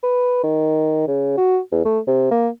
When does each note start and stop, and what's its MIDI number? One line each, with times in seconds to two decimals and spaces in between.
0.03 0.41 71
0.43 1.04 51
1.08 1.35 49
1.37 1.59 66
1.72 1.81 40
1.85 1.99 57
2.07 2.27 48
2.31 2.48 58